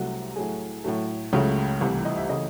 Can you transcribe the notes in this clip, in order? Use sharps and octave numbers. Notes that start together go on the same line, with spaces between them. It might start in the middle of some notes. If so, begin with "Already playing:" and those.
Already playing: C2 C3 F#3 A3 F#4
A2 F#3 A3 G#4
A2 F#3 A3
C#2 C#3 F#3 A3
C2 C3 E3 A3 A4
D#5
E5
C#3 E3 A3 D#5